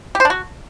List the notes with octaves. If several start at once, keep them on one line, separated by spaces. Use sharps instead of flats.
G4
C5
D4
F#4